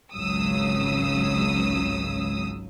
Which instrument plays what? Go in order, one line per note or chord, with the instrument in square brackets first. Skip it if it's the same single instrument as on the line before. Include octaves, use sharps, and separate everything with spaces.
[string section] G#1 C#2 C#3 F#3 D#6 E6